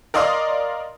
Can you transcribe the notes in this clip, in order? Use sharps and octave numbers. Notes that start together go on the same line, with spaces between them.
A#4 D5 D#5 F5 C6 D#6